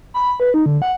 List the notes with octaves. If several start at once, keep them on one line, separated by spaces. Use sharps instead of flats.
B5
B4
D#4
D3
F#5